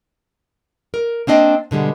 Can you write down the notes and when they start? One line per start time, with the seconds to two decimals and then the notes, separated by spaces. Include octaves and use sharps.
0.94 A#4
1.27 A#3 C4 D4 D#5
1.71 B2 D3 G3 G#3